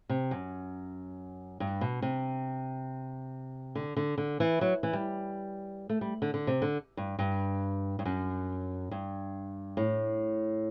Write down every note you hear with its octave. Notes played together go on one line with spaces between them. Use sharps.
C3
F#2
G2
B2
C3
D3
D3
D3
E3
F#3
E3
G3
A3
G3
D3
D3
C3
D3
G2
G2
G2
F#2
G2
A2